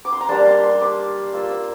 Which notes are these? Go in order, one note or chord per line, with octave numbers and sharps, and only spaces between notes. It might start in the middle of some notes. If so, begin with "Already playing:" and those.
D6
C6
A#5
G3 A#3 D4 A5
C6
C6
D6
A#3 F4 E6
E6